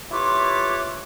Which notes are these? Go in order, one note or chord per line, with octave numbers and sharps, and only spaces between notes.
E4 F4 G4 B4 C#5 D6